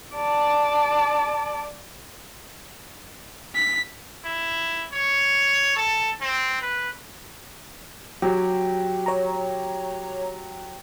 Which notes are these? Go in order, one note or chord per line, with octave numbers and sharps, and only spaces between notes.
D5 A5
B6
E4
C#5
A4
C4
B4
F#3 G4
C#5 A#5